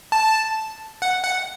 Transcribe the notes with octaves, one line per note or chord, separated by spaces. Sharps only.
A5
F#5
F#5